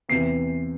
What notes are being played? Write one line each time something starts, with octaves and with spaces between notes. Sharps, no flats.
E2 C3 E3 C7